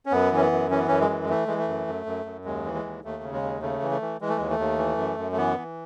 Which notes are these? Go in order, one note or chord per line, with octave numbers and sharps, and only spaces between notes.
C#4
F#2 B3
E3 C#4
B3
F#2
E3 C#4
B3
F#2 C#4
G#3
E3
G#3
E3 A3
E3 G#3
A3
F#2
F#2
F#2
F#2
D#2 G#3
E3
G#3
D#2
D#2 A3
C#3
G#3
D#2
C#3 A3
E3
A3
E3
E3 G#3
A3
D#2 G#3
A3
D#2
E3
F#2
F#2
A3
E3 B3
E3